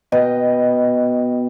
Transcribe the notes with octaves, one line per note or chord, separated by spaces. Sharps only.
B2 B4 D#5 G5